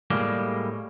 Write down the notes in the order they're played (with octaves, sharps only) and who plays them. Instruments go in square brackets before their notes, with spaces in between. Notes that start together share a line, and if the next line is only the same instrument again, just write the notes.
[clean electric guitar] A2 G3 G#3 A#3